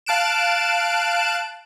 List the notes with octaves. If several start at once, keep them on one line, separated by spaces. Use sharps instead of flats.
F5 A5 F#6 D7 E7